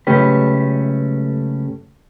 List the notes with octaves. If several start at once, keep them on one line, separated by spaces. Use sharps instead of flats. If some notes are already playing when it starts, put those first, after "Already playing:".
C#2 F#2 A3 C#4 G4 B4